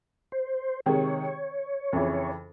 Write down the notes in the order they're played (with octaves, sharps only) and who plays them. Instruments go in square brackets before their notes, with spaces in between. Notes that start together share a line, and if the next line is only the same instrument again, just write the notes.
[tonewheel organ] C5
[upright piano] C3 D#3 G#3 [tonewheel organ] C#5
[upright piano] F2 C#3 E3